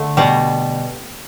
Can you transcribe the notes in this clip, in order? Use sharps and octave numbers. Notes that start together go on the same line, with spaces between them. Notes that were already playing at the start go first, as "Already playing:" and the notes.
Already playing: D3 A3
B2 G3